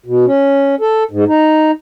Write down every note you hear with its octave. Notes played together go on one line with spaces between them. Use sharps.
B2
C#4
A4
G#2
D#4